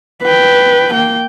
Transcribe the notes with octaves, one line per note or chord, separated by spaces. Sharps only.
B4 G5
A#3 G5